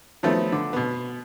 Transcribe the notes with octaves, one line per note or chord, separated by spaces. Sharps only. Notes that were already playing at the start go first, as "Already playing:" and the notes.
D#3 F3 F#3 A3 B3
D3
B2 B3